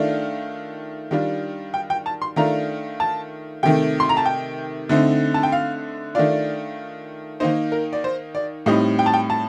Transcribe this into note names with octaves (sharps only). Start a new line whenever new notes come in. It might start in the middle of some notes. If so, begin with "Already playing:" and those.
Already playing: D#3 A3 D4 F4 F5
D#3 G3 D4 F4
G5
G5
A5
C6
D#3 A3 D4 F4 A#5
A5
C3 D#3 A3 G5
C6
A#5
A5
G5
D3 A3 C4 D#4
A5
G5
F5
D#3 A3 D4 F4 D5
D#3 A#3 D#4 C5
A#4
D5
C5
D5
A2 G3 C4 D#4 D#5
G5
A5
G5
A5